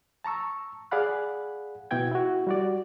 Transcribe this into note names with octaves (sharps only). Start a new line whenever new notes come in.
A5 A#5 C#6 E6
G#4 D5 F5 F#5 B5 F#6
B2 B3 E4 F#4 G5 G#6
E4 F#4
G3 F#4 D5